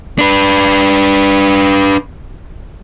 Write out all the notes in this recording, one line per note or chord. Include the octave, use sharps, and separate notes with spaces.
D4 B4